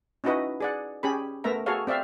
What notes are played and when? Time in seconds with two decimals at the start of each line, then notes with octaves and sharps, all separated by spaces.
0.24 C#4 D#4 E4 F#4 B4 D#5
0.61 G#4 D5 F#5
1.03 C#4 G4 G#4 B5
1.44 A3 B3 A#4 E5 A#5
1.66 F#4 G#4 A4 C#5 F5
1.87 C4 D5 E5 F5